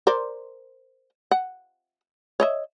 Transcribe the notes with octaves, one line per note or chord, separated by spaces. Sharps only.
A#4 C5 D5
F#5
C#5 D#5 E5